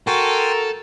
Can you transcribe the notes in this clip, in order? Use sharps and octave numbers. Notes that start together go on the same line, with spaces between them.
F#4 A4 A#4 G5 G#5 C6